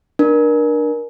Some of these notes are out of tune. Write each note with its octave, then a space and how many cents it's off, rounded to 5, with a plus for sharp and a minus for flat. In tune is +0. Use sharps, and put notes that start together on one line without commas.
D4 +20 A#4 +25